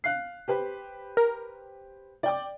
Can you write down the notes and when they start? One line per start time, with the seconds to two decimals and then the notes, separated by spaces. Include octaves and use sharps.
0.04 F5 F#6 C7
0.48 G4 B4 C5
1.17 A#4
2.23 D5 G5 D6